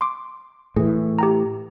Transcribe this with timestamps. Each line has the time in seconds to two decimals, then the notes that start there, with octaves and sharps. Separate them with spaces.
0.01 C6 D6
0.76 A2 E3 G#4
1.19 G4 G5 A#5